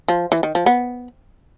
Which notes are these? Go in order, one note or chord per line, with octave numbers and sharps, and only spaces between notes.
F3
E3
D#3
F3
B3